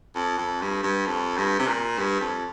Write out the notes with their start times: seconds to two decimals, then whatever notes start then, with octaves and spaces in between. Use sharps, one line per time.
0.15 F2
0.38 F2
0.62 G2
0.83 G2
1.07 F2
1.37 G2
1.59 C3
1.67 A#2
1.98 G2
2.20 F2